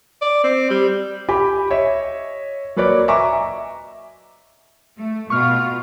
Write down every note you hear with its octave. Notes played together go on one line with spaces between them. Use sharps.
D5
C4
G3
G4 G#5 B5
C#5 D#5 E5
F#3 A#3 B4 C#5 D5
D#5 E5 G#5 A#5 C#6 D6
E5
A3
B2 F4 C#6 F6